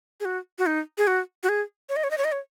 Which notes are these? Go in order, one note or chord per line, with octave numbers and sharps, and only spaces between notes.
G#4
F#4
F#4
D#4
G#4
F#4
F#4
G#4
C#5
D#5
C#5
D#5
C#5
D#5
C#5